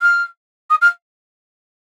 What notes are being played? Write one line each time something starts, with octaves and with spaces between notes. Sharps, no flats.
F6
D#6
F6